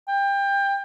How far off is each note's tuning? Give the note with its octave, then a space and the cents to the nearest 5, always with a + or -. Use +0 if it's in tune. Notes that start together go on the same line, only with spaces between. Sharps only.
G5 +25